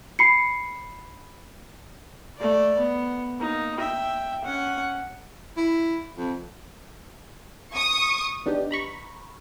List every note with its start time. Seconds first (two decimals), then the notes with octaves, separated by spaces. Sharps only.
0.19 B5 C7 C#7
2.37 A3 D5
2.78 B3
3.38 A#3 D#4
3.79 E5 G5
4.44 C#4 F#5
5.57 E4
6.17 F2
7.74 C#6 D#6
8.46 B3 D4 D#4 G4
8.71 A#5 B5 C#6